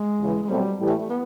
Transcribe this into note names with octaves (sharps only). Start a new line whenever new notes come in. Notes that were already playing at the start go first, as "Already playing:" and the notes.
Already playing: G#3
E2 C#3 E3
G#3
B2 F#3 G3 A3 C4
A2 E3 G3
A3
A3
B3